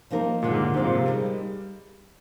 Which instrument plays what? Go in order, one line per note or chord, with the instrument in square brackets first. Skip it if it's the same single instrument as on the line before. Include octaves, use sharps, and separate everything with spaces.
[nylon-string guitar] F3 A#3 D#4 A#4
[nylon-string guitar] D#2 D3 G#3 [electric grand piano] A#2
[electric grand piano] G#2
A#2
[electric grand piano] G#2 [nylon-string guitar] F3 G#3 C4 F4 C5
[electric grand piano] A#2
C3
[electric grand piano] G3 [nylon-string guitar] G#3 D#4 A#4